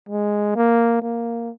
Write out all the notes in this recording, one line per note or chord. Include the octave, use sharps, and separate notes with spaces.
G#3
A#3
A#3